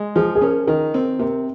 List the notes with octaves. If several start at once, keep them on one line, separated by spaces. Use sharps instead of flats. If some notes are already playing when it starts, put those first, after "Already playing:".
Already playing: G#3
F3 G#4
G#4
C#4 A#4
D#3 A#4
C4
C3 A#4